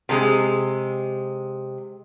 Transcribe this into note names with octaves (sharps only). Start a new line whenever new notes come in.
C3 G#3